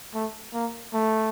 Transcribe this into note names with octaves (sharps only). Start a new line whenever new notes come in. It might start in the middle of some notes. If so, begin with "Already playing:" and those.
A3
A#3
A3